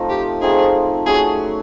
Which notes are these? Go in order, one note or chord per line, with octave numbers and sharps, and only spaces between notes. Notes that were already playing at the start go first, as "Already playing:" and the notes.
Already playing: F3 A3 C4 D#4
G4
F3 A3 C4 D#4 G#4
F#3 A3 C#4 G#4